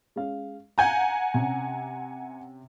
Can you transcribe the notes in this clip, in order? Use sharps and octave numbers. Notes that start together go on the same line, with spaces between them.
G#3 C#4 F5
F5 F#5 G#5 A#5 G6 G#6
C3 C#4